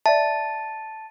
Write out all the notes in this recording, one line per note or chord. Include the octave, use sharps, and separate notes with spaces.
D5 E5 A5